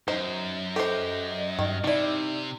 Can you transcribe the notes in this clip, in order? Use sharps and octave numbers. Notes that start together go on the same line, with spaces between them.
F#2 D#4 C5
G4 A4 C5 D#5
G2 D#3
C3 G3 D#4 E4 D5